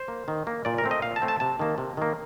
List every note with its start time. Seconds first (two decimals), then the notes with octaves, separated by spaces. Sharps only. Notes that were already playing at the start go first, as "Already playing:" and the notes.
Already playing: C5
0.08 A#3
0.28 D#3
0.47 A#3
0.65 A#2 D5
0.78 A#4
0.84 A3 C4
0.91 D#5
1.02 A#2 F5
1.16 A5
1.22 A3 C4
1.28 A5
1.40 C3 A5
1.59 D#3 A#3
1.78 C3
1.97 D#3 A#3